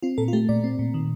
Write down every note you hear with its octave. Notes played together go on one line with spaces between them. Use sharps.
C4 F4
A#2 A4
F4
A3 G4
A#2 D5
C4
A#2
D#3